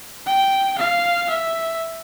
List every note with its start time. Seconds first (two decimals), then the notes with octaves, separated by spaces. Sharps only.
0.26 G5
0.78 F5
1.30 E5